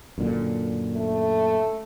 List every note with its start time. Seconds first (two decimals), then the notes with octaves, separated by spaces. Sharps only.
0.18 F#2 A#2 D3
0.96 A3